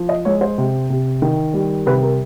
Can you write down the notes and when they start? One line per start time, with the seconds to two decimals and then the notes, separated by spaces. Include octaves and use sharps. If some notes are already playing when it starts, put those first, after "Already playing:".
Already playing: F3
0.09 D#5
0.25 G#3 C#5
0.41 C5
0.58 C3
0.90 C3
1.22 D#3
1.54 G3
1.86 C3 B4
2.02 A#4